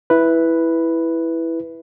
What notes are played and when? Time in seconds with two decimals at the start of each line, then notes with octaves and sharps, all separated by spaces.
0.10 E4 B4